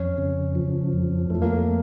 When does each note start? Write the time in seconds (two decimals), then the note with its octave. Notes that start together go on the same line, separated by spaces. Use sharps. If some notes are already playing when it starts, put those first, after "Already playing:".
Already playing: F2 C#4
0.18 C#3
0.55 F3
0.93 F2
1.30 F2 A3
1.42 A#3
1.53 A3